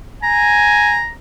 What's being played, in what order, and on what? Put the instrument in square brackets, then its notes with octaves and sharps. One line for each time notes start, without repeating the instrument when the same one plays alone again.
[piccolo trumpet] G#5 [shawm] A#5